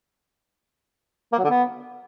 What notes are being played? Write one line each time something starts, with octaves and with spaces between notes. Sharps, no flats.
A#3
F#3
D3
B3